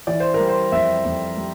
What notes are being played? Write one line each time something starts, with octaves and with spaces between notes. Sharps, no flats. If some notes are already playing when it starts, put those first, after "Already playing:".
E3 D5
C5
A#4
G3
C5
F2 E5
F2
G3